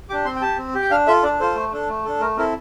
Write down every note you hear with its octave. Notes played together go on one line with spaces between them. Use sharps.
D4 G4 D6
C4 C6
G5
G4 A5
C4
G4
G5
D4 F5
F4 A4 E5
D4 D5
F4 A4 C5
A3
D4 A4
A3
D4 A4
A3 A#4
C4 E4 A4 A#4